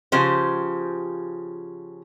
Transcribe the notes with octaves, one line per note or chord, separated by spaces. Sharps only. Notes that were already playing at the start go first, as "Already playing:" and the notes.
C#3 F3 G4 C5